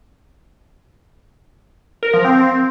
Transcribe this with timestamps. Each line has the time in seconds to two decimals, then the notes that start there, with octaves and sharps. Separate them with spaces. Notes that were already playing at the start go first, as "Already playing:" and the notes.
2.03 A#4
2.14 F3
2.24 C4